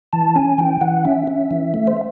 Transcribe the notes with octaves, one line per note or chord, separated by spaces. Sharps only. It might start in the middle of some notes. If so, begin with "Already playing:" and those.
E3 A5
C#4 G#5
E3 G5
E3 F#5
C#4 E5
C#4
E3
A3
C5